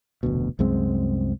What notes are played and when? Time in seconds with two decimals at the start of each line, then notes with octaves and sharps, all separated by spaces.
0.23 F1 D2 B2
0.59 C2 F#2 G#3 C4